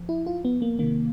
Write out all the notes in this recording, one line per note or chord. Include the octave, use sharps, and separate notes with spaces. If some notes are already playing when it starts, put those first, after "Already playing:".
Already playing: F3
E4
F4
B3
A#3
C3 D#3 A#3